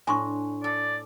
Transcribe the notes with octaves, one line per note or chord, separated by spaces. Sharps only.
A2 D4 G#5 C6 C#6
A4 D5